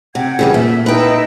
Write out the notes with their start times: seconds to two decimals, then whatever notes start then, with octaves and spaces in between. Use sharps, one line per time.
0.15 C3 F#5 G5 G#6
0.39 C#3 E3 G3 F4 G#4
0.54 A#2 A3 A#3 E5
0.86 D#4 E4 B4 D#5 G5